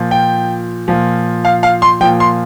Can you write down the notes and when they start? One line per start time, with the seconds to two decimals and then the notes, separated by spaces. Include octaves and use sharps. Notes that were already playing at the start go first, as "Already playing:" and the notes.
Already playing: A#2 F3
0.11 G5
0.88 A#2 F3
1.45 F5
1.63 F5
1.82 C6
2.01 A#2 F3 G5
2.20 C6